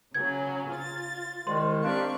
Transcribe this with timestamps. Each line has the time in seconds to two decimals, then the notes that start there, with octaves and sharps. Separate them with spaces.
0.14 C#3 F#3 C#4 G#6
0.71 F4 A6
1.47 C2 D#3 G#3 C6
1.83 A#3 C4 D4 G4 D5 C#6